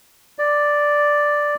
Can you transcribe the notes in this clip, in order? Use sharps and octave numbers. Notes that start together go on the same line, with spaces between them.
D5